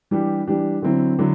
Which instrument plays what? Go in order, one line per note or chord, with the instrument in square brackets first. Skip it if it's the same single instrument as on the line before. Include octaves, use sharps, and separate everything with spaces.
[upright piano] E3 G3 D4 G4
E3 G3 D4 G4
D3 F#3 C4 E4
D3 F#3 E4